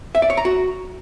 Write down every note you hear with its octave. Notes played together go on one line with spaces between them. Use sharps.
E5
D5
C#5
A#5
F#4